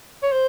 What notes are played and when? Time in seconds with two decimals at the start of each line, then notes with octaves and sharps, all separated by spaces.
0.23 C#5
0.32 C5